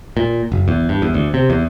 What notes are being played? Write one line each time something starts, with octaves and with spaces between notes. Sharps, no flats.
A#2
F#1
E2
G2
E2
D2
C3
E2